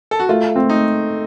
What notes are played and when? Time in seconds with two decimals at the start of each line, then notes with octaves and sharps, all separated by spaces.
0.11 A4
0.19 F#4
0.29 A3 F4
0.56 C4
0.70 D#4